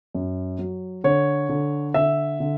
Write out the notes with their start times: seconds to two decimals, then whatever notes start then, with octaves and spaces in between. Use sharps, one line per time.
0.14 F#2
0.59 F#3
1.04 D3 C#5
1.49 D3
1.94 D3 E5
2.40 D3